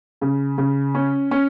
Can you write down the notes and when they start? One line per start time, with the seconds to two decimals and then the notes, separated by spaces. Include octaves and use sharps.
0.21 C#3
0.58 C#3
0.95 C#4
1.31 C#4